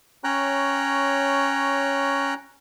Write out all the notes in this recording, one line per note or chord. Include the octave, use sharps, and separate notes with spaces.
C#4 C#5 G5 A#5 F#6